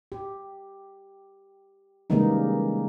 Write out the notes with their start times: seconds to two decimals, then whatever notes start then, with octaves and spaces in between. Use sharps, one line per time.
0.12 G4
2.10 C#3 E3 G3 G#3 A#3 D#4